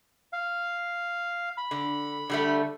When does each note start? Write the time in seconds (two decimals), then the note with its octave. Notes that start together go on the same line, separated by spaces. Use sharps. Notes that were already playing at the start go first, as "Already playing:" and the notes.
0.33 F5
1.58 B5
1.71 D3
2.30 D3 G3 A3